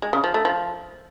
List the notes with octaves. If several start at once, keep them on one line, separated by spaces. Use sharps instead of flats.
G#3
C#3
F3
A3
F3